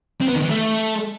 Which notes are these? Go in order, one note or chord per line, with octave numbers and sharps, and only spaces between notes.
C4
B3
D#3
E3
A3